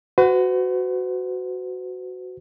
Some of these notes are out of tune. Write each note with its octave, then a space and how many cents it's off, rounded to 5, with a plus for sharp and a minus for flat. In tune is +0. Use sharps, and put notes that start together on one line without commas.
F#4 +0 B4 +45